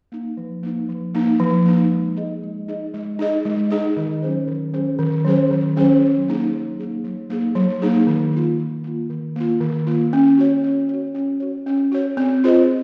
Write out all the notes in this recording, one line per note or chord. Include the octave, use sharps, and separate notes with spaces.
A#3 D#4
F3
A#3 D#4
F3
A#3 D#4
F3
A#3 D#4
G#3
D#4 G#4 D#5
G#3
D#4 G#4 D#5
G#3
D#4 G#4 D#5
G#3
D#4 G#4 D#5
D#3
F#3 C#4 G#4 C5
D#3
F#3 C#4 G#4 C5
D#3
F#3 C#4 G#4 C5
D#3
F#3 C#4 G#4 C5
F#3
A#3 D#4 G#4
F#3
A#3 D#4 G#4
F#3
A#3 D#4 G#4
F#3
A#3 D#4 G#4
D#3
A#3 F4
D#3
A#3 F4
D#3
A#3 F4
D#3
A#3 F4
C#4
F#4 C#5
C#4
F#4 C#5
C#4
F#4 C#5
C#4
F#4 C#5
C4
F4 G#4 C5 D#5